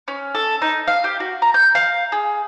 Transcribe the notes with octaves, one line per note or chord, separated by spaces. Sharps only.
C#4
A4
D#4
F5
G4
F#4
A#5
G6
F5
G#4